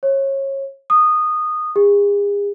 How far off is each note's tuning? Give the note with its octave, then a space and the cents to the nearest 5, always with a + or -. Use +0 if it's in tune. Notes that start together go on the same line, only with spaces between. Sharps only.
C#5 -25
D#6 -15
G#4 -40